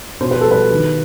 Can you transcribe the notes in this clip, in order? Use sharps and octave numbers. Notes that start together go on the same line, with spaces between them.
B2 C5
B4
G3 A4
B4
D#3